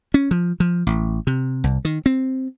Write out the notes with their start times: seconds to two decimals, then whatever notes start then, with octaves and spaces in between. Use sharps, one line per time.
0.14 C#4
0.31 F3
0.60 F3
0.87 A1
1.27 C3
1.64 C2
1.85 D#3
2.06 C4